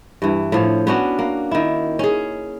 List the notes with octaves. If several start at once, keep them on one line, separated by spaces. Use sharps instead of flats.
G2 E3
A2 F3 C#5
B3 C#4 D4 F#4
A#3
D#3 E4
C#4 G#4